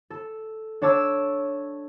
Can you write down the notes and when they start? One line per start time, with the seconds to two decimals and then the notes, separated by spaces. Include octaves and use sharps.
0.10 A4
0.82 D4 C#5 A5 D6 E6